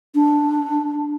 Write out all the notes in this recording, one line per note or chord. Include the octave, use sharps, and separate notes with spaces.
D4